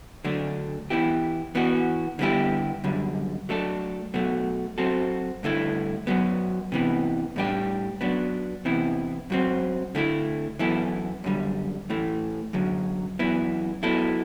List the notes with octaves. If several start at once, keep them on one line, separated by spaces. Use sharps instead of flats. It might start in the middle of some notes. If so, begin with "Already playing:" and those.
D3 F#3 A3 D4
E3 B3 E4 G4
E3 B3 F#4
D3 G3 B3 E4 G4
F#2 D3 G3
F#3 A3 D4 A4
B2 F#3 A3
F#3 C4 F#4 A4
G2 D3 A3 E4
F#2 F#3 B3
C3 E3 B3
A2 G3 D4 G4
F#3 B3 D4
C3 E3 B3 E4
F#2 F#3 C4
D3 A3 E4
F#2 E3 B3 E4 A4
F#2 D3 G3
A2 E3 A3
F#2 D3 F#3
F#2 E3 B3 E4
F#3 B3 E4 A4